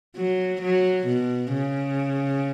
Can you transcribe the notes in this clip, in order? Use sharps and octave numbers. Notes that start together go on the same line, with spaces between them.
F#3
F#3
B2
C#3